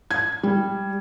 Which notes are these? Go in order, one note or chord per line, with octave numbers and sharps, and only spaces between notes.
G#6
G3